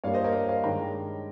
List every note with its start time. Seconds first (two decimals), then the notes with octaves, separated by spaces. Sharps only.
0.04 G2 G3 A#3 C#5 F5
0.14 C5 D#5
0.24 A#4 C#5
0.33 C5 D#5
0.49 C#5 F5
0.63 G2 D#3 G#3 G5 A#5